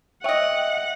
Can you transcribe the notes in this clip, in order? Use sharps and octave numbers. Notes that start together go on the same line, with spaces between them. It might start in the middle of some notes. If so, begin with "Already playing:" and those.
C#5 D#5 E5 F#5 G5